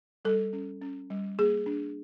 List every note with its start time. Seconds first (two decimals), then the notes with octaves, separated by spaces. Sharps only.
0.25 G3 A4
0.53 C#4
0.81 C#4
1.10 G3
1.38 A#3 G#4
1.66 D4